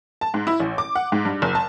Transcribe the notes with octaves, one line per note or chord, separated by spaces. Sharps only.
A5
G#2
E4
A1
D6
F#5
G#2
G2
F#1
A5